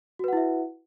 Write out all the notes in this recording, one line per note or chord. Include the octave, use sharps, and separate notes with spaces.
E4 F#4 B4 E5 F#5